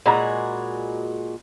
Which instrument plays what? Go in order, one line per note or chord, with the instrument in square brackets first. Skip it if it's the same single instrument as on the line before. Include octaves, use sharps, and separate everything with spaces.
[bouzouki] A#2 G#3 F#4 [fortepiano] A#5 B5